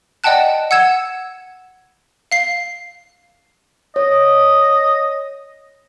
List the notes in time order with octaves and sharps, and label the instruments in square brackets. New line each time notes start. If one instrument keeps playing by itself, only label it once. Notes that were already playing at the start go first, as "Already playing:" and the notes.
[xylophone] D5 D#5 F#5 G5 A5 F#6
F#5 E6 G#6 E7
F5 C7
[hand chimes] C#5 [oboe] D#5